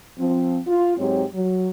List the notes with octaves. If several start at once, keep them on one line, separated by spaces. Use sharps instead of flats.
F3 C4
F4
G#2 F#3 C4 G4 C#5
F#3